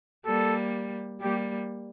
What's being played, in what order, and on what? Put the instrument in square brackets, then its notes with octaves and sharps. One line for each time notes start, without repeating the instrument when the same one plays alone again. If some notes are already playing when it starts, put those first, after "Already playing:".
[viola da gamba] G3 A#3 [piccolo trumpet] A4
[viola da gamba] G3 A#3 [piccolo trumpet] G4